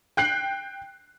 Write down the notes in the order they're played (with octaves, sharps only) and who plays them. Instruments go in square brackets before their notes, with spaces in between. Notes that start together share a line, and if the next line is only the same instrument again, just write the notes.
[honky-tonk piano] G5 F#6 C7 F#7